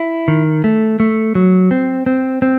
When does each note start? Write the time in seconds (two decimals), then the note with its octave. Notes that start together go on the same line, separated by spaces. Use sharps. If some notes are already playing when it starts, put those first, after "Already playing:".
Already playing: E4
0.28 D#3
0.64 A3
1.00 A3
1.35 F#3
1.71 C4
2.06 C4
2.42 C4